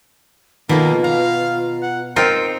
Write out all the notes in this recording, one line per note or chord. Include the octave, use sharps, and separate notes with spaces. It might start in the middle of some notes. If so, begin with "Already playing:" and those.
B2 D#3 A#3 D#4 F4 A4
F5 A#5
F#5
C4 D#4 F4 A#4 C5 G5